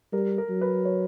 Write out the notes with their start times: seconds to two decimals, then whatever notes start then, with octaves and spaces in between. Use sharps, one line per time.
0.13 G3 A#4
0.38 A#4
0.50 F#3
0.61 B4
0.85 C#5